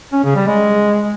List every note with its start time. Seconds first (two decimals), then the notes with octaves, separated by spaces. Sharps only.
0.13 C#4
0.24 C#3
0.36 G3
0.47 G#3